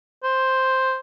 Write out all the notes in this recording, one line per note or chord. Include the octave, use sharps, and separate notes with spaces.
C5